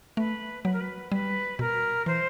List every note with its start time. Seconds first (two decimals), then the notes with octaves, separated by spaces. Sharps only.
0.17 A3 B4
0.65 F#3 B4
0.73 A#4
0.80 B4
1.12 G3 B4
1.59 B2 A#4
2.06 E3 C5